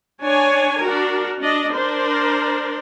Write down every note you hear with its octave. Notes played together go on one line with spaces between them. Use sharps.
D4 C#5 G#5
D4 F#4 A#4
D4 D#5
D4 A#4 C5